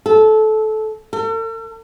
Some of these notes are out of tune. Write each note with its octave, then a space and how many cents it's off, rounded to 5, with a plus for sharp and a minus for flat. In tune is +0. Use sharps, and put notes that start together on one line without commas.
A4 -20
A4 +45